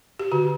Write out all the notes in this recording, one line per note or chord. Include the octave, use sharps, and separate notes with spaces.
G4
D3 F#4